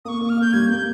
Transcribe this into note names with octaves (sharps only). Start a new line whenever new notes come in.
A#3 C#6 D#6
A#3
F6
A#3 G6
G3 G#6
A#3 G6